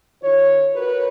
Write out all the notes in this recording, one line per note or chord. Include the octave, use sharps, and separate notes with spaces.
D#3 F4 C#5
F#4 A#4 B4 C#5